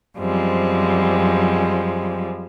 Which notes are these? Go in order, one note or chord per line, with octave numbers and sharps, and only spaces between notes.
F#2 F3 G3 G#3 C4